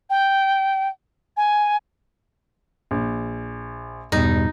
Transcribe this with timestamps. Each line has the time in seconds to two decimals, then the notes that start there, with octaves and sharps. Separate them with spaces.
0.09 G5
1.36 G#5
2.91 A#1
4.12 E2 G2 B2 D#4